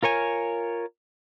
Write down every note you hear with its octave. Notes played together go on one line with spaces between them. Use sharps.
F4 A#4 C#5 G#5